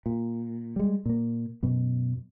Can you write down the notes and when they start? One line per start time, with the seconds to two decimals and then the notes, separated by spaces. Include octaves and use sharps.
0.06 A#2
0.76 G3 G#3
1.06 A#2 A#3
1.63 F#2 B2